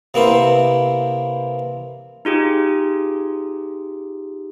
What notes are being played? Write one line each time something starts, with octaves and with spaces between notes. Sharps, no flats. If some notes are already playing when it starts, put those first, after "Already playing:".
C3 A#3 B3 E4 C5
D#4 F4 G4 G#4